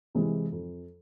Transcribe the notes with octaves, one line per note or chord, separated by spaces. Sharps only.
C3 E3 G#3
F2